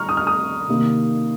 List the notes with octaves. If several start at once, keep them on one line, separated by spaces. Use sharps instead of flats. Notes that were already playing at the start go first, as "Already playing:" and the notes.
Already playing: G3 A#5 C#6 F6
D#6
F6
D#6
C3 D#3 A#3 D#4